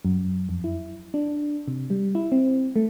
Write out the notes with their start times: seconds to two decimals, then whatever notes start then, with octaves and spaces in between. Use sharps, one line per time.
0.05 F#2
0.49 F2
0.64 E4
1.14 D4
1.68 C3
1.90 G3
2.15 E4
2.32 C4
2.76 A3